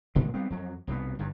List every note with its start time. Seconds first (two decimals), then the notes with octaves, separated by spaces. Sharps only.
0.15 G1 C#2 A#2 D3
0.34 G3 B3 C4
0.50 F2 F#3
0.87 C2 B2 E3 B3
1.19 G1 G2